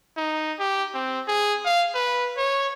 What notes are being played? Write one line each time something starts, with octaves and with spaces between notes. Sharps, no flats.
D#4
G4
C4
G#4
F5
B4
C#5